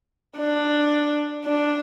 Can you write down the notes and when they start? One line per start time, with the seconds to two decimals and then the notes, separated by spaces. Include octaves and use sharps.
0.38 D4
1.45 D4